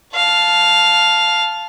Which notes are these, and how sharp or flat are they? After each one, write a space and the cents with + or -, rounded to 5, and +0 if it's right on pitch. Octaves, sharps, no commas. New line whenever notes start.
F5 +0 A5 -5